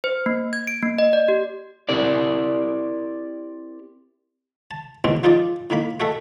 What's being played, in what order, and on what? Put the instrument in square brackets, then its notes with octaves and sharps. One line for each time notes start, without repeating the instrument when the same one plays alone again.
[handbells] C5
A#3
G#6
D7
A#3
D#5
D5
G4
[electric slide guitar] C4 E4 G4 A#4 D5
[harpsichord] A5
D#2 B2 E3 G#3 C4 C#4
F3 D#4 F4 G#4 D5 D#5
A2 D#3 A#3 B5
A3 F#4 G#4 A4 D#5 E5